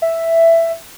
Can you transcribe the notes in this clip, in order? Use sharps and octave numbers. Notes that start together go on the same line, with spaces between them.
E5